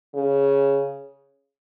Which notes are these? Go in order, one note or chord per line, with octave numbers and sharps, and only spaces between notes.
C#3